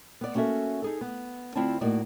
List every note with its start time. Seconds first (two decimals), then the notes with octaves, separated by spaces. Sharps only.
0.21 B3 D5
0.35 A#3 C#4 F#4 A4 E5
0.82 D#4 G#4 A4
1.01 B3
1.55 D2 C4 E4 F4 D5 A5
1.81 A2 A#3 D#4 F#4 D5